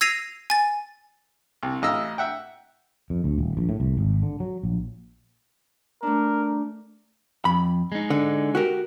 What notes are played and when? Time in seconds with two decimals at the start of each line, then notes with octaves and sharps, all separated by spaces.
0.01 E6 G#6 A#6 C7 D#7 F7
0.50 G#5 A6
1.63 C2
1.82 A1 D#5 F5 E6
2.18 E5 F#5 G5
3.10 F2
3.24 D2
3.38 D#1
3.57 A#1
3.69 A2
3.80 C2
3.97 G#1
4.23 D3
4.40 F#3
4.64 A#1
6.03 A3 D4 A#4
7.45 F2 B5
7.92 G#3 D#4
8.10 D3
8.55 F#4 G4 A#4